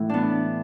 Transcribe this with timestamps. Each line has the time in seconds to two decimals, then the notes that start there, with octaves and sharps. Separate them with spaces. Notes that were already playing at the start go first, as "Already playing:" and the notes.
Already playing: A2 E3 E4
0.09 B3 D4